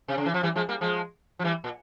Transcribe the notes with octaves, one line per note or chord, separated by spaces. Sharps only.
C3
C#3
E3
F3
E3 G3
F3 G#3
G3 A#3
F3 G#3
F3
E3 G3
A#2